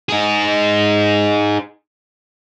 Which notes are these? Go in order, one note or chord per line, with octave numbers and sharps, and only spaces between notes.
D#4 G#4